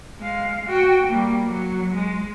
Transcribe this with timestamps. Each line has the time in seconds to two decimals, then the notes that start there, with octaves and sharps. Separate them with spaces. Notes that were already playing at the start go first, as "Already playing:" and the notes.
0.19 G#3 F5
0.66 F#4 G5
1.07 G3 A#3
1.46 F#3
1.94 G#3